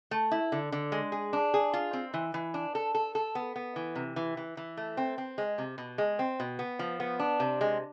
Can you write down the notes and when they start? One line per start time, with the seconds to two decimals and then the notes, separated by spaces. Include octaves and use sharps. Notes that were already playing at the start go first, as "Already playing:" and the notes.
0.11 A3
0.31 E4
0.52 D3
0.72 D3
0.92 G#3
1.12 G#4
1.33 D4
1.54 G#4
1.73 F4
1.93 C4
2.14 E3
2.34 E3
2.54 D4
2.75 A4
2.95 A4
3.15 A4
3.35 B3
3.56 B3
3.76 E3
3.95 C3
4.16 E3
4.37 E3
4.57 E3
4.77 A3
4.97 C4
5.18 C4
5.38 G#3
5.58 C3
5.78 B2
5.98 G#3
6.19 C4
6.40 B2
6.59 B3
6.79 F3
7.00 B3
7.19 D4
7.40 C3
7.61 G#3